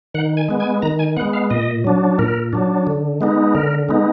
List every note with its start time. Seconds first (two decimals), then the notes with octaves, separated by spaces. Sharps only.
0.14 D#3 F#5
0.37 G#5
0.48 G#3 B3
0.60 G#5
0.82 D#3 A#5
0.99 G#5
1.16 G#3 B3 F#5
1.33 F5
1.50 A#2 D#5
1.84 F#3 D4
2.19 A#2 A#4
2.53 F#3 D4
2.87 D3
3.21 G#3 B3 D#4
3.54 D3 A#4
3.89 G#3 B3 D#4